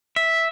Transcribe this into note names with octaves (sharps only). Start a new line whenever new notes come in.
E5